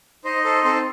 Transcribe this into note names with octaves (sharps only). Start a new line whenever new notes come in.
D#4 C5 D#5
A4 C5
C4 A4 C5